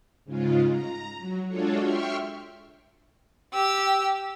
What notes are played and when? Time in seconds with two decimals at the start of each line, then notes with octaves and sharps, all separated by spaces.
0.25 G#2 C#3 G#3 F4
0.68 A#5
1.19 F#3
1.47 G#3 D4 F4 F#4 A4 C#5
1.79 E5 G5 C6 C#6 F6
3.54 G4 E6